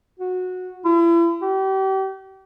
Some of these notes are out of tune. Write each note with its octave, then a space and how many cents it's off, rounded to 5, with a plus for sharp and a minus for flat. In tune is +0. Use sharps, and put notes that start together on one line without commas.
F#4 -15
E4 +40
G4 -35